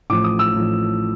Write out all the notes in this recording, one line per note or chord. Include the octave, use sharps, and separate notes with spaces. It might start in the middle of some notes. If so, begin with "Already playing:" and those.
A1 A2 F3 D6
D#6
E6
A1 A2 F3